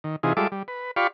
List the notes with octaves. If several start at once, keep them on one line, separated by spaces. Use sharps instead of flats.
D#3
C3 E3 D#4 F4 G#4
G3 G#3 F4 A4 E5 D6
G3
B4
F4 G4 D5 F5 B5 C#6